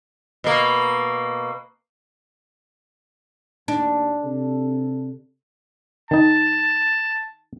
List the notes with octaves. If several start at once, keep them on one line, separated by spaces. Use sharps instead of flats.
B2 A#3
D#2 D4
C3 A4
D#3 D#4 A5